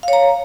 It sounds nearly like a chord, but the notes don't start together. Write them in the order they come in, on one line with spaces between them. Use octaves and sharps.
F5 C#5 A#5